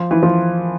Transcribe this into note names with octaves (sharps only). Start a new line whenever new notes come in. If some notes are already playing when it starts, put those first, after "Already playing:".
Already playing: F3
E3
F3